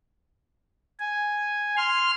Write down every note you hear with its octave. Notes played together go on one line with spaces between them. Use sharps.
G#5
C6 F6